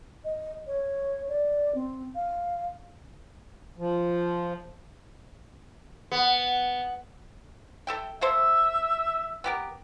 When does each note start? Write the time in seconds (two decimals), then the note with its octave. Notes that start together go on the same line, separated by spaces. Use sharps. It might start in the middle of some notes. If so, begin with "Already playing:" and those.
0.25 D#5
0.67 C#5
1.29 D5
1.75 C4
2.15 F5
3.78 F3
6.12 B3
7.87 A4 E5 G5
8.21 A#3 A4 C5 E5
9.44 B3 G4 A#4